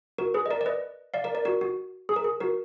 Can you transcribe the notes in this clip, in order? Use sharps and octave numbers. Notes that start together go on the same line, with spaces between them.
F#4 A#4
G#4 B4
D#5
A#4 D5
D5
B4 D#5
D5 F5
A#4 D5
A#4 D5
F#4 A#4
F#4
G#4
A#4
G#4
F#4 A#4